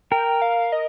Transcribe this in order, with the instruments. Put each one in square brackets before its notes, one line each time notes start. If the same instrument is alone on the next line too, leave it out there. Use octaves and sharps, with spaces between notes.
[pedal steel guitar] A#4 [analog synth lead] G5
[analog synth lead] F5
D#5